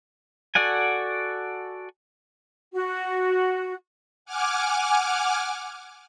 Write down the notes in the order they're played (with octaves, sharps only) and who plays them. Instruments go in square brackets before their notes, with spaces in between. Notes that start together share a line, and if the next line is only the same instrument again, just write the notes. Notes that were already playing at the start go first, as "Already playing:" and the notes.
[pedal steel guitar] F#4 A4 D5 F#5 G#5
[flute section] F#4
[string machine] F#5 G#5 D6 F6